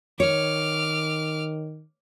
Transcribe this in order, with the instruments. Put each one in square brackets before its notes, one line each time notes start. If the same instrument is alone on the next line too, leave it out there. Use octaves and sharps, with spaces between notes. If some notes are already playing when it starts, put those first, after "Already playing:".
[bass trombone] D#3 [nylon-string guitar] C#5 [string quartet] D6 F6